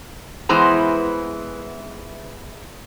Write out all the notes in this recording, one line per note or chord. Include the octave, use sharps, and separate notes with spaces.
E2 E3 G#3 B3 C5 A#5